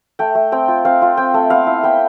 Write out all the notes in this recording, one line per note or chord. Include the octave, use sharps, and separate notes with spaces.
A3 G5
A3
C4 G5
F4
C4 F5
F4
C4 G5
A3
B3 F5
E4
B3 G5